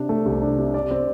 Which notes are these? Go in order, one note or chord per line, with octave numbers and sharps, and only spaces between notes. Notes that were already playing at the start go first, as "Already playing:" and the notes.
Already playing: C3 D4
A3
C2
D4
C3
D5
C4